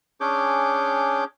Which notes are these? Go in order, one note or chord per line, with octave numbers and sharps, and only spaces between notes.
C#4 D4 G#4 C#5 D6 G6